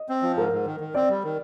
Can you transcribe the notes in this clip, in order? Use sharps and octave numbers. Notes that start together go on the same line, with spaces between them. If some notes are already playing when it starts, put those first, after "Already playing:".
Already playing: D#5
C4
F3
G#2 A#4
G#2
D#3
D#3
C4 D5
G3
D#3